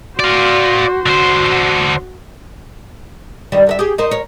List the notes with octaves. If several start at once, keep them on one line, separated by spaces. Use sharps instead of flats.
F#4 C5 D5 F5
D3 F#4 C5
G2 D#3 G3
D3 A#4 E5
G4 G#4
D#4 A#4 C5
A#4 C#5